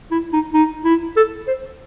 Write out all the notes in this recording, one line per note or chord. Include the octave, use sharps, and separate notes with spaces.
E4
D#4
D#4
E4
A4
C5